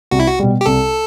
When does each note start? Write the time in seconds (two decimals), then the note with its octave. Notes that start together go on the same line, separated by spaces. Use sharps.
0.11 C2 F#4
0.20 E4
0.27 F#4
0.40 B2 G3
0.61 G4
0.66 C2 A4